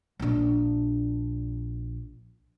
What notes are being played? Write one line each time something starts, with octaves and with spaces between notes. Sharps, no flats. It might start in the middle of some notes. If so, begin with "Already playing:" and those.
A#1 D4